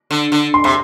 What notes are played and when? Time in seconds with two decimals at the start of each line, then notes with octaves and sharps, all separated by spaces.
0.11 D3
0.32 D3
0.54 C6
0.64 C3 C6